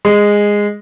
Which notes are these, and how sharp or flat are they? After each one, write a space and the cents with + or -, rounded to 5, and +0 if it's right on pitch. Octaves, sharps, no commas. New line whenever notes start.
G#3 -10